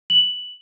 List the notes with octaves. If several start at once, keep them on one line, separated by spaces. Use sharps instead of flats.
F#7